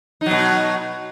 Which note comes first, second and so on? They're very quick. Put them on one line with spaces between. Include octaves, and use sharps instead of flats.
D#4 F#3 B2